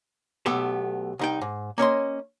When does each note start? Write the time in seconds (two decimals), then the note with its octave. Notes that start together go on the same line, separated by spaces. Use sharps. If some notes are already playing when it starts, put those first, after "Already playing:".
0.46 B1 A3 B3 G4 A4
1.19 C2 D#4 G5
1.41 G#2
1.78 A#3 C#4 D#5 C6